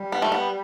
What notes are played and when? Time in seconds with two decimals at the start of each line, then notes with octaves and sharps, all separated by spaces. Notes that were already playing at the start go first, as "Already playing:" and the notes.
Already playing: G3
0.12 B3
0.22 A3
0.32 B3